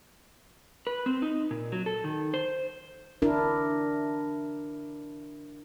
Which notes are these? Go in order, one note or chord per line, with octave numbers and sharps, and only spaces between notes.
B4
C4
D#4
A#2
F#3
A4
D#3
C5
D4 E4 A#4